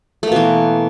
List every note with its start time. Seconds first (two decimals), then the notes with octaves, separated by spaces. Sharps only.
0.23 A3
0.27 A#3
0.32 B2
0.36 E3